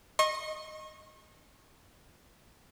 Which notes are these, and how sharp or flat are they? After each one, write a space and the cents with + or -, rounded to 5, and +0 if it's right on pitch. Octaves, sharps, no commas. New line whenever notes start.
D#5 -5 C#6 -40